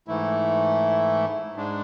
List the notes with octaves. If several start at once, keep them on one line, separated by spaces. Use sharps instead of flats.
G#2 E3 A3 E4
G#2 G#3 D4